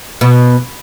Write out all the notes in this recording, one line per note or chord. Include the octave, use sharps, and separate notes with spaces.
B2